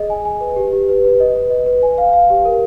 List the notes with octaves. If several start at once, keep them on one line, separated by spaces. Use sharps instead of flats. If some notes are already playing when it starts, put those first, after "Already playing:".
Already playing: G#4 D#5
G#5
G#5
B4
G4
G4
B4
B4
D#5
B4
D#5
B4
G#5
F5
F5
G4
A#4